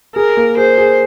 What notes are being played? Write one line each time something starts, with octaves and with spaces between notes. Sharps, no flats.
G#4 A#4
A#3
G#4 C5
G#4